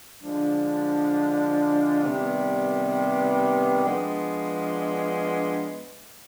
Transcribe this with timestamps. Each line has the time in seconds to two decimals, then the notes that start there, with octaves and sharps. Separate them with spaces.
0.22 D3 F3 G#3 D4
2.03 C3 D#3 G3 B3
3.84 F3 G#3 B3 D4